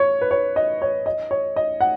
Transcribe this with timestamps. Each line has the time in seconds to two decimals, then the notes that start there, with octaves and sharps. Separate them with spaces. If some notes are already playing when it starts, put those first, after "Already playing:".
Already playing: C#5
0.21 B4
0.31 C#5
0.56 D#5
0.82 C#5
1.06 D#5
1.31 C#5
1.56 D#5
1.81 F#5